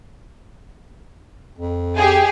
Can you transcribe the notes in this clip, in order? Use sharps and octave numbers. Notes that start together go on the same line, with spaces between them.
F2
G4 G#4